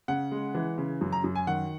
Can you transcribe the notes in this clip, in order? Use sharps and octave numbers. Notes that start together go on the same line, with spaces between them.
C#3 F#5
G#3
E3
C#3
F#2
A#5
F#2
G#5
D#3 F#5